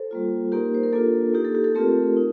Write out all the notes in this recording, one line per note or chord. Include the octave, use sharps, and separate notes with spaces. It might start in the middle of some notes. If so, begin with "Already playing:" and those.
Already playing: A4 C5
G3 A#3 F4
A#3 D#4 G4 A#4
C5
A#4
A#3 D4 F4 A4
A#3 D#4 G4
A4
G4
A4
A3 C4 F4 G4 A#4
D#4